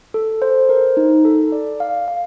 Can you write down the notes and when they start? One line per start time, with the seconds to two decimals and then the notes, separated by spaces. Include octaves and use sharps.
0.14 A4
0.42 C5
0.69 A#4
0.97 D#4
1.25 A4
1.52 D5
1.80 F5
2.08 F5